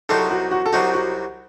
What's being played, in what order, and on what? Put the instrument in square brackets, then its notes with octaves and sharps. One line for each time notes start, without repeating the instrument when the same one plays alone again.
[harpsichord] C2 C3 F#3 C4 D#4 [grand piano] A4
[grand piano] F#4
F#4
A4
[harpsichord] C2 C3 F#3 C4 D#4 [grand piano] F#4
[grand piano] F#4